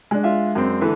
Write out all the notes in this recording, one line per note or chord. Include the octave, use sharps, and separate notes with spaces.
G#3 D4
F4 E5 F5
F#2 C4
D3 E3 B4